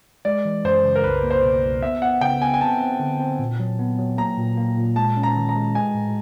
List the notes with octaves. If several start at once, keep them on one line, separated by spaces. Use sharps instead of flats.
G#3 D5
E3
F#2 C5
C#3
A#4
C2 B4
A#3
C5
B2
C2
B3 E5
B3 F#5
C#3 G5
B3 G#5
G#5
C4 A5
C4
D3
C4
A#2
F#3
B3
F#3
A#3 A#5
A#2
A#3
A#2
G#3 A5
C#4
A#5
D#3
A#5
G#3
G#3 G#5
A2